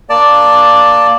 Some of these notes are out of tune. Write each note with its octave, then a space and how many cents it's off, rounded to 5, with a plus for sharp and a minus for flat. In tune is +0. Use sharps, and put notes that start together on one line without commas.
A#3 +0 D5 +0 A5 +5